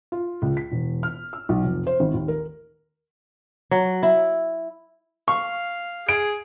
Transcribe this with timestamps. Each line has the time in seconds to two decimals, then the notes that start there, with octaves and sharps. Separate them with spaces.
0.12 F4
0.42 C#2
0.57 B6
0.71 E1
1.03 F6
1.33 E6
1.49 B1
1.64 F1
1.87 C5
2.00 G#1
2.14 D#2
2.28 A#4
3.71 F#3
4.03 E4
5.28 F5 C#6
6.09 G#4 D7